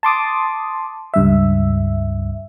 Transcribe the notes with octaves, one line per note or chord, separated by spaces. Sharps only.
A5 C6 D6 D#6
C#2 G2 E5